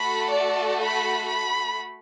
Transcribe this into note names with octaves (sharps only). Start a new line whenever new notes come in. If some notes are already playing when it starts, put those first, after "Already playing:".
Already playing: A3 F#4 A4 B5
D5
B5
B5